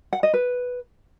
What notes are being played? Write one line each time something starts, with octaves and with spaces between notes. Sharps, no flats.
F#5
D#5
B4